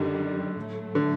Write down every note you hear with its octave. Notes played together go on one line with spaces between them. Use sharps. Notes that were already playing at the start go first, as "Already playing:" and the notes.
Already playing: F#2 D3 D#3 G3
A2 F#3 A3
D3